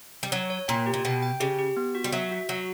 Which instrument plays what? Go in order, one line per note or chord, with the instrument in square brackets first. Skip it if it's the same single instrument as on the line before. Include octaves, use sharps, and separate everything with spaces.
[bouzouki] G3
[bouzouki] F#3 [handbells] C#5
[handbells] C#5
[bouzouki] A#2 [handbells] G5
[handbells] G4
[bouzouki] A#2
[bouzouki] B2 [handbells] G5
[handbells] G5
[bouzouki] C#3 [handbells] G4
[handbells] G4
B3
F#4
[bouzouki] G3
[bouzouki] F#3 [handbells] E5
[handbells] F#4
[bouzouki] F#3 [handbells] F#4